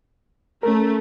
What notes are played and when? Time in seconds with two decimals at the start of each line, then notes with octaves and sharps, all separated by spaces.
0.63 A3 C#4 A#4